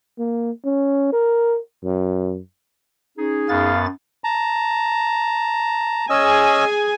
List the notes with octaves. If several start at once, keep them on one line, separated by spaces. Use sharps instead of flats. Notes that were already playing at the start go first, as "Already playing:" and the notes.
A#3
C#4
A#4
F#2
C#4 D#4 G#4
F#2 B3 F5 A6
A5 A#5
C#4 G#4 D#5 G#5 E6